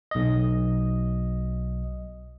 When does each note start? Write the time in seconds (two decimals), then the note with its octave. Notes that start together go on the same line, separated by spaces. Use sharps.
0.11 B1 D#5